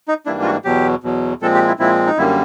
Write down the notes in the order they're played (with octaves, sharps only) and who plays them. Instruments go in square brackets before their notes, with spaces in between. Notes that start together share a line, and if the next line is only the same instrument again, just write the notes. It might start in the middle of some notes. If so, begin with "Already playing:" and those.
[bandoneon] D#4
G#2 E3 G3 A#3 D4 E4
F4
F#4
E2 B2 F#3 G4
E2 B2 F#3
A#2 F3 G#3 C4 A4
G4
E4
A#2 F3 G#3 C4 E4
D#4
F#2 D3 G3 A#3 E4